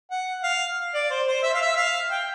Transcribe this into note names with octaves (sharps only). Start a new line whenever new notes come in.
F#5
F5
D5
C5
C5
E5
F5
E5
F5
G5